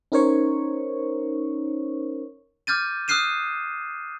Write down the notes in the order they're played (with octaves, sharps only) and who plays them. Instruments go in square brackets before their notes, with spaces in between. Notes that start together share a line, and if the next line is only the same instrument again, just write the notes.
[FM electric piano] C#4 D#4 A#4 C5 C#5 C#6
[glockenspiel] D6 F6 G6 A6 D#7
D#6 F6 F#6 C7 D#7 E7